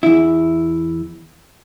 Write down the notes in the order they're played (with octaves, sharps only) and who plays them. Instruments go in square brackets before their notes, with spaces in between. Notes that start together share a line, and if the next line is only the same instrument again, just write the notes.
[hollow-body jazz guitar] E2 E4